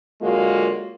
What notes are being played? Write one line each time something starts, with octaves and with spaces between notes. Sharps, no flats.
D3 F#3 G#3 A#3 F4 F#4